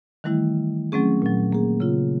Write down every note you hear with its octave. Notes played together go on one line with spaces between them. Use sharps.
D#3 E3 G3 A3 E4
F#3 A3 C4 C#4 G#4
A#2 F#3
A#3 G#4
C#3 F4